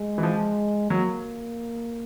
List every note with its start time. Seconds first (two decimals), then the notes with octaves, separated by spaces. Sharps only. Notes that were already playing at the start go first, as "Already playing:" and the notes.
Already playing: G#3
0.18 E3
0.23 F3
0.90 F#3 A#3